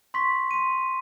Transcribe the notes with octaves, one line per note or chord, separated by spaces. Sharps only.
C6 C#6 B6
C6 D#7